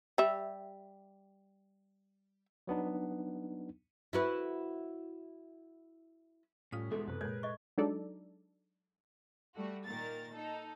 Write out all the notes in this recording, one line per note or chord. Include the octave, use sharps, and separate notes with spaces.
G3 E5
F#3 B3 D4 D#4
E4 F#4 B4
A2 G3 C#4 F4 D#6 B6
E2 G#2 B2 G#3 A4 D5 E5
F#2 C3 B4
A#2 G#3 G#4 A#4 C#5 G#6
D#5 C#6
F#3 G#3 D4 D#4 A4 D5
G3 A3 F#4
A#2 D#3 A#4 A6
D#4 A4